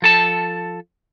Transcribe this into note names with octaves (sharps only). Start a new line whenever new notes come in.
F3 A4 A5